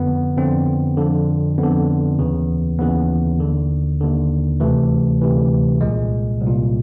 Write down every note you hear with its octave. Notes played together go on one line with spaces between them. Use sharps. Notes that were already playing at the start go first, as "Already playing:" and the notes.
Already playing: F2 D3 B3
F2 D3 C4
F2 D3
F2 D3 B3
D#2 C#3 E3
D#2 C#3 E3 B3
D#2 D3
D#2 D3
D2 C3 E3 A3
D2 C3 E3
C2 A#2 G#3
C2
A#2